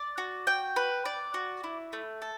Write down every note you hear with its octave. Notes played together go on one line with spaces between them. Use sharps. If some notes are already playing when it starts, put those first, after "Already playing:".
Already playing: D5
F#4
G5
B4
D5
F#4
E4
A3
A4